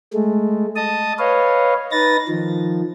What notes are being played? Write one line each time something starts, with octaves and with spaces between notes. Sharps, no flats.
G#3 A3
D#5 A5 D#6
B4 C#5 D#5 F5
D#4 B4 A6 A#6
D#3 F3